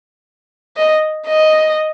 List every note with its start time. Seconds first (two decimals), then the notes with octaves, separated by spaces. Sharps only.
0.76 D#5
1.27 D#5